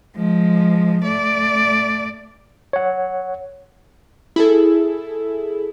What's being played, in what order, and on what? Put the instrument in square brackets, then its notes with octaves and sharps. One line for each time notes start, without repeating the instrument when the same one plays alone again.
[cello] F3 G#3
A3 D5
[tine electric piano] C#5 F#5
[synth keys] E4 G#4 A4